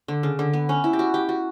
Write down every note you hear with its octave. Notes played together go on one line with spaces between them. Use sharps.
D3
C#3
D3
B3
C#4
E4
G4
F#4
G4
F#4